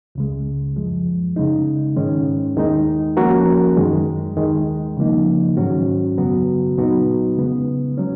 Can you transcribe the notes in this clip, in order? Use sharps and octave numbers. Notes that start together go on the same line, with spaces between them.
C#2 C#3 G#3
F#2 F3 G#3
C#3 G#3 D#4
G#2 D#3 G#3 C#4
D#2 D#3 G#3 D#4
F3 A#3 C#4 F#4 A#4
F#2 D#3 G#3
D#2 D#3 G#3
C#3 F3 A#3 D#4
G#2 D#3 F#3 C#4 F#4
F#2 C#3 F#3 B3 F#4
A#2 F#3 B3 D#4 F#4
C#3 G#3 B3
F#3 C#4